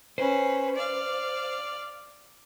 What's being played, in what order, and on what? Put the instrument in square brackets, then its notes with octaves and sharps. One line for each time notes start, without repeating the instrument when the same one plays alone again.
[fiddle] C#4 B4 [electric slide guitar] C5
[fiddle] D5 F5